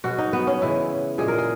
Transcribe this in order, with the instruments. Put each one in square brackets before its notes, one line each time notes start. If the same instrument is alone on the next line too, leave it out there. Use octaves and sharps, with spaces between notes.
[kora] B2 G#3 F#4
D#4
B3
C#4
C#3 E3 G#3 E4
A#2 G#3 G#4
A#4
G#4